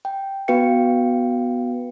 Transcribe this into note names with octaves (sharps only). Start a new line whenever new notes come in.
G5
B3 F#4 B4 F5 G5 C#7